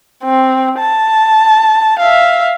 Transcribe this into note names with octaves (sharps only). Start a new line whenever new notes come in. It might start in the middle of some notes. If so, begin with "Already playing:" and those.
C4
A5
E5 F5